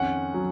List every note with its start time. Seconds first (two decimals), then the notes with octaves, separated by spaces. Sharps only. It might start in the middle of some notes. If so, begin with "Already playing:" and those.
Already playing: F2 D#3 C#4 F#5
0.34 F#3